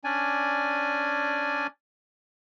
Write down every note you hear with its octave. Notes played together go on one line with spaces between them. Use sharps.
C#4 D4 D5 G#5